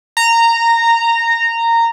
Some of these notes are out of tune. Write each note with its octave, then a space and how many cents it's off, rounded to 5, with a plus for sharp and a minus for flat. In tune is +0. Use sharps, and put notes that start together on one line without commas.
A#5 -15